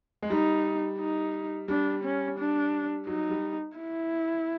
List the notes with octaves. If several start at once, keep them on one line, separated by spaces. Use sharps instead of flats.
G#3
G3 D#4
D#4
G3 D4
C#4
D4
F#3 D#4
G3
E4